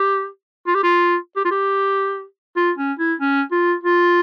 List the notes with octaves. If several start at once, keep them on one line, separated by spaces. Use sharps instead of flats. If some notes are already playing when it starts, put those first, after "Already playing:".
Already playing: G4
F4
G4
F4
G4
F4
G4
F4
C#4
E4
C#4
F4
F4